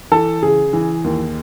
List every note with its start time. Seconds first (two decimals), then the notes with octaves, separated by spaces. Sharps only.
0.11 E3 A4
0.42 C#3 G#4
0.73 E3
1.04 D#2